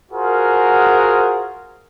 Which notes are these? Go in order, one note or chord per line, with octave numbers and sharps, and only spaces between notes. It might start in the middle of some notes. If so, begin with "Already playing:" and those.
F4 F#4 G#4 A#4 C5 F#5